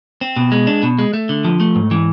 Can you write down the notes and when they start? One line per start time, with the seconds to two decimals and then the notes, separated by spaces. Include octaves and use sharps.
0.21 C4
0.36 B2
0.52 G#3
0.67 D4
0.83 B2
0.99 G#3
1.14 A3
1.29 D3
1.45 F3
1.60 A3
1.75 G#2
1.91 E3